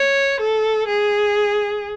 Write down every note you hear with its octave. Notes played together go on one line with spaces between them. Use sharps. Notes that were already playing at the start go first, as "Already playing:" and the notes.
Already playing: C#5
A4
G#4